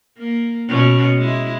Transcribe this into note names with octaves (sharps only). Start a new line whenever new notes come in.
A#3
B2 C#4
G#3 E4